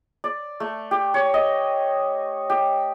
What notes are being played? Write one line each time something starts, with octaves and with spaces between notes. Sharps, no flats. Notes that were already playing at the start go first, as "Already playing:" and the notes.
D5
A3
G4
C#5
D#5
G4